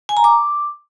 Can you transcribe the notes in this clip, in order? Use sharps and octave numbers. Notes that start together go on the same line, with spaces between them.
G#5
A#5
D6